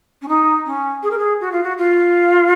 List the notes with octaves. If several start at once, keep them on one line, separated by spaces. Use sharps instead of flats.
C#4
D#4
C#4
G#4
A#4
G#4
F#4
F4
F#4
F4